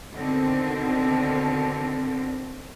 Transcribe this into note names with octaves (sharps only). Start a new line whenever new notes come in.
B2 D3 D#3 C4